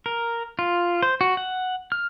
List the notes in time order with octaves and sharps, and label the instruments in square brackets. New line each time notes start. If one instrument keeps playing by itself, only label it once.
[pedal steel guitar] A#4
F4
C5
F#4
F#5
F6